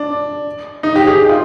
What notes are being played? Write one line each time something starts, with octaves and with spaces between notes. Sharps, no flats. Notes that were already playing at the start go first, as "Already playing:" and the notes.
Already playing: D4
D#4
G4
G#4
F4